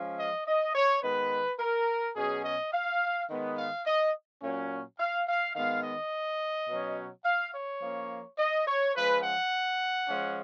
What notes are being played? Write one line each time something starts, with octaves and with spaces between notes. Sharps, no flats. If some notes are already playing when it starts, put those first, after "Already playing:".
Already playing: F3 G#3 C#4
D#5
D#5
C#5
D#3 G#3 B3 B4
A#4
B2 F#3 C#4 G#4
D#5
F5
D#3 G#3 B3
F5
D#5
A#2 F#3 C#4
F5
F5
D#3 G#3 B3 F5
D#5
B2 F#3 C#4
F5
C#5
F3 A#3 C#4
D#5
C#5
F3 G#3 C#4 B4
F#5
F3 G#3 C#4